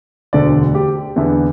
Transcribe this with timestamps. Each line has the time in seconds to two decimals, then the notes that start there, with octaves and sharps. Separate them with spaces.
0.33 E1 D2 D3 D5
0.75 G4
1.16 E2 D3 B3 E4